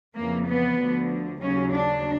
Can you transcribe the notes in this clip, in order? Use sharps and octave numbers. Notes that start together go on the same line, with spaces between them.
F2 C#3 E3 A#3
B3
D2 D3 F3
D#2 C#3 F#3 C#4
D4